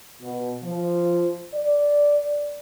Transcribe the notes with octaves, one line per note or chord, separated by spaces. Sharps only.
B2
F3
D5